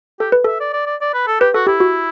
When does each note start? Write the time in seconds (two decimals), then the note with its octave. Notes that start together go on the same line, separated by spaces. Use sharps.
0.20 G4 A4
0.32 B4
0.45 A4 E5
0.60 D5
0.73 D5
0.86 D5
1.01 D5
1.14 B4
1.27 A4
1.40 G4 B4
1.54 F#4 A4
1.67 E4 G4
1.80 F#4